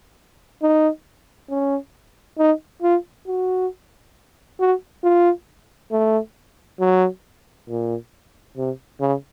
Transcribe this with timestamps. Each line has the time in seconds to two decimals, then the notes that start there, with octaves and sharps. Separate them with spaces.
0.62 D#4
1.50 C#4
2.38 D#4
2.82 F4
3.27 F#4
4.59 F#4
5.04 F4
5.92 A3
6.80 F#3
7.69 A#2
8.57 C3
9.00 C#3